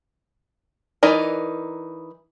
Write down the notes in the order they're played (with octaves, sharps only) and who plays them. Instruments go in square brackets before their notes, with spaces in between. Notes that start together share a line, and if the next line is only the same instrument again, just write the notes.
[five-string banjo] E3 D#4 A#4 D5